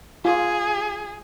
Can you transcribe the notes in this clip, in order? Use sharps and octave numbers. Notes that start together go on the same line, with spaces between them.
F4 G#4